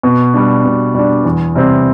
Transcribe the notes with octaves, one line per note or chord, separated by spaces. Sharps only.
B2
G3 D4
B2
G3 D4
E2
C3 G3 C4